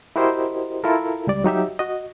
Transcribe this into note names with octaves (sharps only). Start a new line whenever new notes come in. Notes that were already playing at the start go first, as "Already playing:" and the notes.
E4 F#4 G4 A#4 C5 D#5
E4 F4 A4 A#4
C#2 G3 D5
F#3 D#4 G4 E5
F#4 D#5